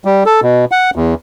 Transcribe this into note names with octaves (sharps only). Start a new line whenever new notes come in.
G3
A4
B2
F#5
E2